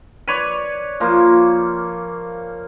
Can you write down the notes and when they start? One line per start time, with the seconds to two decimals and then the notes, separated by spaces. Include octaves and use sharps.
0.28 B4 C#5 D5
1.00 F3 A#3